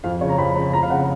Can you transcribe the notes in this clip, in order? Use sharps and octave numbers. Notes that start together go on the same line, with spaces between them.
F2 F5
C#3 C#5
A#5
F2 B5
C#3 B5
F2 A#5
F5
C#3 F#5